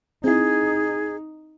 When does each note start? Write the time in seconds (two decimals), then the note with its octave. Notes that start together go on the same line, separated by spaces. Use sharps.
0.24 C4 D#4 E4 G#4